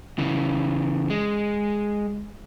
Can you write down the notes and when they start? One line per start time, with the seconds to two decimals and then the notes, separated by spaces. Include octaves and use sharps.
0.18 C#3 E3
1.10 G#3